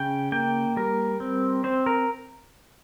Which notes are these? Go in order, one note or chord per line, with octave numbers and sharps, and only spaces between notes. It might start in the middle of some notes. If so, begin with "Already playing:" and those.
Already playing: C#3 G5
A#3 G5
G3 A#4
C4
C4 C5
A#4